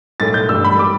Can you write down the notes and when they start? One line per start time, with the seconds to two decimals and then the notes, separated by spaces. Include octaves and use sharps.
0.20 B1 A2 A3 A6
0.34 G6
0.49 A1 G2 G3 E6
0.64 B5
0.78 G3 D6